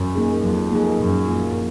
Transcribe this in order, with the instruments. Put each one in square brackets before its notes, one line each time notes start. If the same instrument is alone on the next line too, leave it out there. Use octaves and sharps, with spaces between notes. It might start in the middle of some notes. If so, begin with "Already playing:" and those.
Already playing: [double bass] F#2
[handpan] A#3 D#4 G#4
[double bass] F2 [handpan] F#3
[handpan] A#3 D#4 G#4
[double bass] F#2 [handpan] A#2
[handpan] F3 A#3 F4